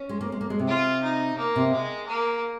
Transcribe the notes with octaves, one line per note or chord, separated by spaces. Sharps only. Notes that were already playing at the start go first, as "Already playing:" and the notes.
Already playing: C#4
G#3
A#3
G#3
A#3
G#3
C3
F4
D#4
A#3
C3
G#3
A#3